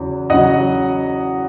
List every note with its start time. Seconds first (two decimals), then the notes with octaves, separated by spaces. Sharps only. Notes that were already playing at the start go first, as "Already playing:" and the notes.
Already playing: E2 C#3 F#3
0.29 E2 C#3 F#3 D#5 F#5